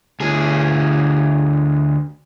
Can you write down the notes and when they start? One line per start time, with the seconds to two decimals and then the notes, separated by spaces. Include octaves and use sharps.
0.20 D2 G#4